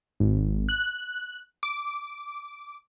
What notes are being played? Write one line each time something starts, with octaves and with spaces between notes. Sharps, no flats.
G#1
F#6
D6